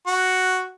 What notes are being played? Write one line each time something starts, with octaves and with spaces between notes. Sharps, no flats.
F#4